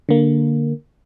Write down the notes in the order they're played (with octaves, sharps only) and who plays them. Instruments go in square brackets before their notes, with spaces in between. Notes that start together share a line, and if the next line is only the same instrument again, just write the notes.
[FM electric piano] D3 A#3